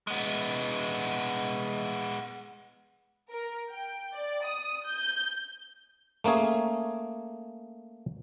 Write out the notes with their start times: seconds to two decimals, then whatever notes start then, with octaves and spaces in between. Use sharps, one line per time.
0.07 G#3 B3
3.30 A#4
3.70 G5
4.16 D5
4.46 D#6
4.87 G6
6.24 A3 A#3 C#4 G#4